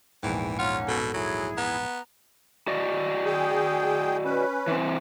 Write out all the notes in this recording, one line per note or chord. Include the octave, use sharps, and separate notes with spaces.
A#1 E2 G#2 E3 G5
A#3 C#4 F4 F#5
B2 A4
F#3 E4 G#4
B3 A#5
F#4 D5 D#5
G#4 G5
C#4 B4
E3 C4